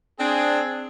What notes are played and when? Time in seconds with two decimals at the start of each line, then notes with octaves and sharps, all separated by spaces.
0.20 C4 D4 G#4